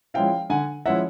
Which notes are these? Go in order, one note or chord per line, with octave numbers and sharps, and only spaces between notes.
F3 G#3 C#4 E4 F5 G5
D3 F#5 G#5
F3 G#3 C#4 E4 E5 F#5